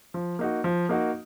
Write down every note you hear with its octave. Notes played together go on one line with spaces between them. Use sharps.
F3
A#3 D#4 F#4
F3
A#3 D#4 F#4